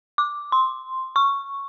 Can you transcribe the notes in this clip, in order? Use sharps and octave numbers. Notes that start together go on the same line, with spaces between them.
D6
C6
C#6